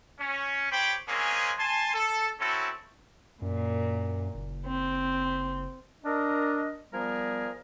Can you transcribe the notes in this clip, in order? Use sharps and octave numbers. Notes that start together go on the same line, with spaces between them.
C#4
G4 C5 C#5 G5 B5 D6
G#3 A#3 C4 C#4 G#4 G#5
G#5 A5 C6
A4
C4 C#4 E4 F#4 A4
F#2 A#2
F#1
C4
D4 A#4 D#5
F3 G3 B3 G#4 A#4 D5